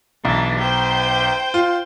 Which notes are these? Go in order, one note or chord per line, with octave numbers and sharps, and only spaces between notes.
B1 E3 D4
C5 G5
F4